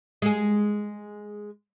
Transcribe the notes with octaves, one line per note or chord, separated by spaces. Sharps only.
G#3 G#4